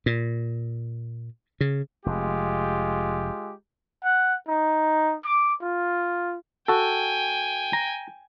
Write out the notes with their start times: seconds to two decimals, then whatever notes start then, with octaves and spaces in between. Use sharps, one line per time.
0.06 A#2
1.61 C#3
2.06 F1 G#3 F4 G4
4.04 F#5
4.48 D#4
5.25 D6
5.62 F4
6.68 F#4 A4 G5 G#5
7.73 A#5